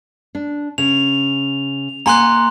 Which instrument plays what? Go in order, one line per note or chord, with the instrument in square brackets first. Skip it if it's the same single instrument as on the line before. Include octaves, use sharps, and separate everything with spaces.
[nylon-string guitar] D4
[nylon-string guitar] C#3 [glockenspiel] F7
[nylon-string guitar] A#3 F#5 G#5 [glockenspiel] A#5 C6 F#6